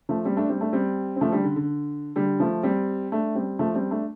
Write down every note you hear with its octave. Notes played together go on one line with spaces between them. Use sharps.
F3 A3
G3 C4
A3 D4
G3 C4
A3 D4
G3 C4
C4
F3 A3
D3 G3
D3
D3
D3 G3
F3 A3
G3 C4
A3 D4
G3 C4
F3 A3
G3 C4
A3 D4